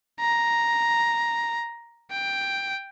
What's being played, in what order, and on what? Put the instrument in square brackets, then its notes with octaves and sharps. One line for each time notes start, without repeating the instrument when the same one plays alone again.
[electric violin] A#5
G5